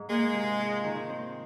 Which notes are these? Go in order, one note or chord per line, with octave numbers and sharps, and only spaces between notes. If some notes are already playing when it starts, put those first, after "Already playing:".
Already playing: G#2 D#4
G#3 A#3
C3
F4
D#3
C4